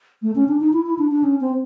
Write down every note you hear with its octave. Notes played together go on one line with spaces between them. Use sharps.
A3
C#4
D4
D#4
E4
E4
D4
D4
C#4
C4